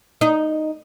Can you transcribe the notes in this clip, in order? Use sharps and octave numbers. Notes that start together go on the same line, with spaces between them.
D#4